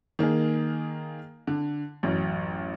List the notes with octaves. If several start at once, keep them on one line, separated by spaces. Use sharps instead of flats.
D#3 A#3 D#4 G#4
D3
A1 F#2